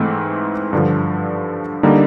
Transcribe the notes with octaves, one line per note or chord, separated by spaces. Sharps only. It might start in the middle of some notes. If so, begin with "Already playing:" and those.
Already playing: G#2 E3 A3 C4 E4
G2 D3 F3
D3 G3 A#3 D#4